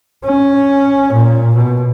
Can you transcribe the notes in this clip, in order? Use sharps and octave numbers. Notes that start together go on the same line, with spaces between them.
C#4
A#2
B2